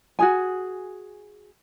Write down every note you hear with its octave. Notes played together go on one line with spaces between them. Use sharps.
F#4 G#4 G#5